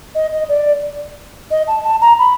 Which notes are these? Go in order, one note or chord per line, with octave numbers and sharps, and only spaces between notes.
D#5
D#5
D5
D#5
A5
A5
A#5
B5